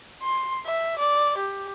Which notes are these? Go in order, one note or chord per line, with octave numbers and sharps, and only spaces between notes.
C6
E5
D5
G4